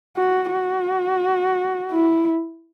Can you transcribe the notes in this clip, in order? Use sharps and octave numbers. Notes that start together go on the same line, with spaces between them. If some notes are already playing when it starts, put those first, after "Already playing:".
F#4
F#4
E4